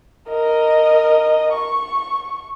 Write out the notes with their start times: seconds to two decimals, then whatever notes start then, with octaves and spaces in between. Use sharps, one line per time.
0.29 A#4 D#5
1.53 C#6